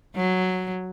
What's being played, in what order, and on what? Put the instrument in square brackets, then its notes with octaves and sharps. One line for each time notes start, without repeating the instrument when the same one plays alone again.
[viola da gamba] F#3